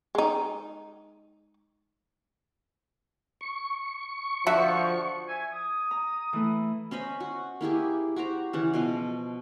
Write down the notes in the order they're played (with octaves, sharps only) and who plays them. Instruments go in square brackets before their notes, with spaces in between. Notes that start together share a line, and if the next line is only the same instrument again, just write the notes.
[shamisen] G#3 D#4
[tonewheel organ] C#6
[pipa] D3 F#4 E5 [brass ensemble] F3
[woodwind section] E5 G#5
D#6
[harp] A#5
E3 A3
[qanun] C#4 C5 D#5 B5
F#4
A#3 E4 G4 G#4
F#4 G4 C5 A#5
C#3 E3 F#5
B2 F3 D#5 C6